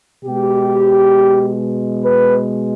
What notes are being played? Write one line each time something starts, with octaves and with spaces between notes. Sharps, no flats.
B2 G#3 G4
B4